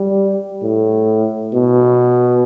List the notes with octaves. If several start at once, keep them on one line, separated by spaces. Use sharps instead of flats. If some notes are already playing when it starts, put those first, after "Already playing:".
Already playing: G3
A2
B2